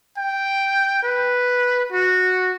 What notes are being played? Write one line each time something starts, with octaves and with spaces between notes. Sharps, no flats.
G5
B4
F#4